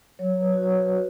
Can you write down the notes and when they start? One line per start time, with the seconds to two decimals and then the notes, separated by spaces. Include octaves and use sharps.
0.19 F#3 C#5
0.41 B4
0.53 F#4
0.63 C#5
0.86 F#4 B4